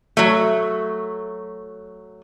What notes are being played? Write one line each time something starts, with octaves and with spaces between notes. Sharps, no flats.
F#3 A3